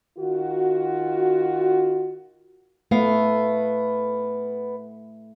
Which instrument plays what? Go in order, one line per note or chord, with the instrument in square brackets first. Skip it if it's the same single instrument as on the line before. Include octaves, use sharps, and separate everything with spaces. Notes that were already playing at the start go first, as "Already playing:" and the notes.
[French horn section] D#3 F4 F#4
[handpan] A3 [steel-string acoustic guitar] B3 F5